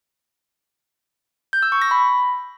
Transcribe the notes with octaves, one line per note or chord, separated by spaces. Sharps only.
G6
E6
C#6
A#6
B5